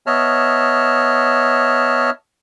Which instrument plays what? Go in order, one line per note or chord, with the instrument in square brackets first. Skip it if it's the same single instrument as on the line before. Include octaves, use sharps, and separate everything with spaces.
[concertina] B3 C#5 D#5 E5 A5 F6